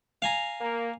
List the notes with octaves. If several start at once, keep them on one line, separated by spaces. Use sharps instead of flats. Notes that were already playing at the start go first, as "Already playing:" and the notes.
F5 G#5 A#5
A#3